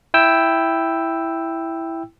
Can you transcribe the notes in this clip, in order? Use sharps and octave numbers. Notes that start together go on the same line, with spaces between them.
E4 G5 E6